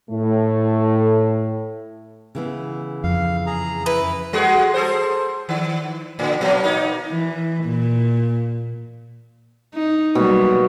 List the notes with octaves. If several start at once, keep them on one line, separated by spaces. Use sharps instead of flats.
A2 A3
C#3 E3 B3
F2 F5
G#4 A#5
E4 B4
G3 F#4 G#4
G#4 A4 C5
D#3
A2 D3
A#2 F#3 A#3
A#3 D#4
E3
A#2
D#4
B2 F#3 G3 A#3